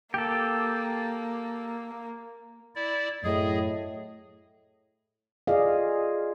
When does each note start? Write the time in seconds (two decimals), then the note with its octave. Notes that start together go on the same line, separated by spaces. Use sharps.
0.14 A#3 G4 A4
2.75 E4 D5
3.24 F#2 A2 F#3 G#4 D#5
5.47 F4 G#4 A4 D5 D#5 F5